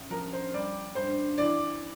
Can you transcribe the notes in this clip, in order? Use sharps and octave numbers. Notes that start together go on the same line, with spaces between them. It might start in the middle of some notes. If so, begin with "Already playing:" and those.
Already playing: A1
F3 A#4
C5
G3 D5
G2 C5
E3 D5